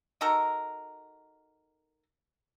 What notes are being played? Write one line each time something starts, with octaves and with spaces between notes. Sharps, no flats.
D#4 F#4 A4 A#4